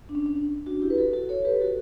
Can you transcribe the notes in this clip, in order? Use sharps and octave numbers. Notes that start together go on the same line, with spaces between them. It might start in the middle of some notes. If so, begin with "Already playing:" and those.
D4
C#4
C#4
D4
D4 F#4
E4 G4
B4
F#4 A4
F#4 A4
A4 C#5
G4 B4
F#4 A4